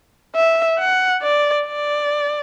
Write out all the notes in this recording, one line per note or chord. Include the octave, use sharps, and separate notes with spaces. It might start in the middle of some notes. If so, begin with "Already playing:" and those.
E5
F#5
D5
D5